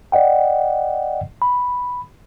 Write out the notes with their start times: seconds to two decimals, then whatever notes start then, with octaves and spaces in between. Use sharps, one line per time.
0.12 D5 D#5 F#5 G5
1.42 B5